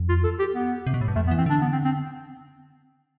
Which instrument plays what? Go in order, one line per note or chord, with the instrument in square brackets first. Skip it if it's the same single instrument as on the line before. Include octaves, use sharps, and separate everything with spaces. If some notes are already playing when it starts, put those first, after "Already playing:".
Already playing: [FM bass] F2
[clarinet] F4
A4
G4
B3
[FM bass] C3
B2
A2
G2
[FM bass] F2 [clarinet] A3
[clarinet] B3
[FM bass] E3
[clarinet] C4
[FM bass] D3 [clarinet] D4
[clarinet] B3
C4
C4